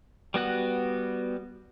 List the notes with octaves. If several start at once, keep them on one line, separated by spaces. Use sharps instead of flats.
G3 B3 F#4 F#6